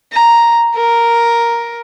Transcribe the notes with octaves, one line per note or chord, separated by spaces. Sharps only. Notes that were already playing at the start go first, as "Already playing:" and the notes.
A#5
A#4